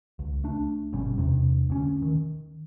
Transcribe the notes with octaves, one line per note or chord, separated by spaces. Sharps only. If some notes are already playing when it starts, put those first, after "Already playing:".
C#2
A3 D4
G1 B2 G3 C#4
E2 G2 C3
D2 C#4
D#3